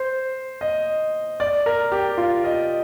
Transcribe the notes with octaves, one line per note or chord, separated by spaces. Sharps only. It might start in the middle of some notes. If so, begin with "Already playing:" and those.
Already playing: C5
D#5
D5
A#4
G4
F4
D#5